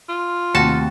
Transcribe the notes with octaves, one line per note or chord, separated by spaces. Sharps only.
F4
D#2 C3 A3 F#4 A5